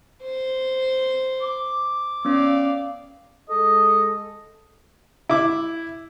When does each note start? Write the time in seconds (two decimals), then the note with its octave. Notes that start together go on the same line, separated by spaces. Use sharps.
0.22 C5
1.42 D6
2.25 B3 C#4 D5 F5
3.50 G#3 A4 D#5
5.29 E4 D6